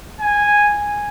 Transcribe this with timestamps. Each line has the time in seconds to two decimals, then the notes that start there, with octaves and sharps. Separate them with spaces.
0.20 G#5